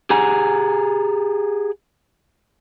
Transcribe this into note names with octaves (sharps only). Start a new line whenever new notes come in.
G4 G#4 F#5 G#5 A#5